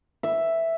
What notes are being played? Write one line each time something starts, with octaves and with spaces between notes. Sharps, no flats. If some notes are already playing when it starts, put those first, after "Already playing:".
E5